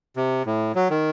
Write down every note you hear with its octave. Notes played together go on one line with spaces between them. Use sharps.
C3
A2
F#3
D#3